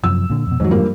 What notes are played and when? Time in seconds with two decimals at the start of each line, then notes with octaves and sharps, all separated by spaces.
0.04 F#2 C3 F3 E6
0.30 A#2 D3
0.47 F2 B2
0.60 F2 G#2 D#3 F#3
0.71 G2 F3 A#3